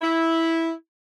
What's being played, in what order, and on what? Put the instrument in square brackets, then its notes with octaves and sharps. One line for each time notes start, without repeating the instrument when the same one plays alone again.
[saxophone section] E4